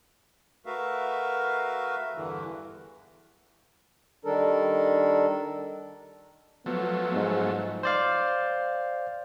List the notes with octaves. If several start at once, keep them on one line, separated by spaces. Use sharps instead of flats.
A3 F#4 A#4 B4 E5 F5
E2 G2 D3 E3
D#3 G3 D4 A4 A#4
F3 F#3 A3 B3
G#2
C5 D5 F5